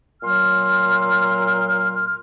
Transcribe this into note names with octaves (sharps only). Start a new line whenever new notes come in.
A#2 F#3 C6 F6